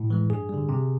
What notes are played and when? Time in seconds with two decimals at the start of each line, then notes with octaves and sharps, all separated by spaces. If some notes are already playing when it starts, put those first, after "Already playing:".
Already playing: A2
0.10 E3 G#3
0.30 G2 G#4
0.49 D3 G3
0.69 C3